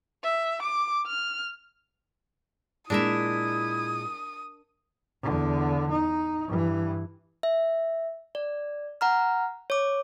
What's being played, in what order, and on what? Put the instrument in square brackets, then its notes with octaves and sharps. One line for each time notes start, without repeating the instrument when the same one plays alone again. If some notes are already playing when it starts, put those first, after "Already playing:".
[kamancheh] E5
D6
F6
[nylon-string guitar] A#2 G#3 [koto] D4 A#4 E5 [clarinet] E4 [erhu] D#6
[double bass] E2 D3
D#4
G2 E3
[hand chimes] E5
D5
F#5 A#5 F6
C#5 D6